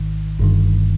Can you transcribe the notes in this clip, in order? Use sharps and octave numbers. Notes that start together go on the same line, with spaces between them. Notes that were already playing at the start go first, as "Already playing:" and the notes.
Already playing: G#1 G#2 D#3
G1 G2 D#3